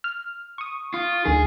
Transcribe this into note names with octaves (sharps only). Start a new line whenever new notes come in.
F6
C#6 D#6
F4
D2 D#3 G#4